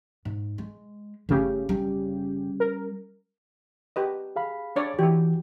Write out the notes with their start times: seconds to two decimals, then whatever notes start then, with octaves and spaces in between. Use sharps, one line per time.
0.25 G#2
0.58 G#3
1.29 G1 C#3 A3 G4
1.69 G3 C#4
2.60 A#4
3.96 G4 B4 D#5
4.36 G#4 F5 B5
4.76 D4 C#5 D5
4.99 E3 E4 F#4 G4